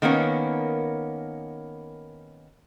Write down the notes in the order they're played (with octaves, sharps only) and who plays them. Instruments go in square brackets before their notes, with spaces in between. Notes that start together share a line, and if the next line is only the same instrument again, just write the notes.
[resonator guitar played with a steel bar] D#3 A#3 B3 C#4